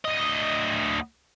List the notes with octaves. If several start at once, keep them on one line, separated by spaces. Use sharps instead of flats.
D2 D#5